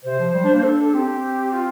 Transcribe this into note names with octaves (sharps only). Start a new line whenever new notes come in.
C3 C5
F3
G3
D4
A#3
D4 A4
A4
C4 G4
C4
F4